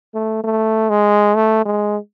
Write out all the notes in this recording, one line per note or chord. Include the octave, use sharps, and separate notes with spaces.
A3
A3
G#3
A3
G#3